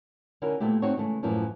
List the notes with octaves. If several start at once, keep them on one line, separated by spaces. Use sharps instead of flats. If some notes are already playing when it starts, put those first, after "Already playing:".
D3 C#4 E4 F#4 A#4
A#2 A3 B3 E4 G4
C4 D#4 F#4 C#5
C#3 E3 G#3 A3
F#2 A2 E3 F3